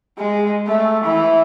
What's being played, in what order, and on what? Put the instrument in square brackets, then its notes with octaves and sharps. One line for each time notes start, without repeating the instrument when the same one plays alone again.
[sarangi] G#3
A3
E3